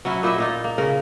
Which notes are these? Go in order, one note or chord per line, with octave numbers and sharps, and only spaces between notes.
F#3 C#4 E4 F#4
A#2 E4 D#5 E5
A#2 D#4 F4
A#3
C#3 C#4 A#4